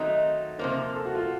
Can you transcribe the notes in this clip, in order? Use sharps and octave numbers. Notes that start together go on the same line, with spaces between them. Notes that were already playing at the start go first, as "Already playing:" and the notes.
Already playing: D#3 F#3 A3 C4 D#4 A#4
C3 F3 A#3 C5
A4
F#4
F4